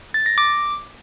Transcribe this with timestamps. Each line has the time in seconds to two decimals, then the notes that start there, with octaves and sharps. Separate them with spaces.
0.14 A6
0.26 A#6
0.38 D6